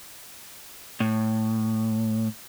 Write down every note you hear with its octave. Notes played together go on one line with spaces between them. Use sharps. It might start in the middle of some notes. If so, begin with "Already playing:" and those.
A2